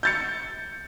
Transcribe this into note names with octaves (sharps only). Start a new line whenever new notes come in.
G6 A6 C#7